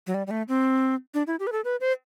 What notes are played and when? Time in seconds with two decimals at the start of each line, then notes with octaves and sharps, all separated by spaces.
0.07 F#3
0.14 G3
0.27 G3
0.31 A3
0.48 C4
1.14 D4
1.27 E4
1.40 G4
1.47 B4
1.52 A4
1.65 B4
1.81 C5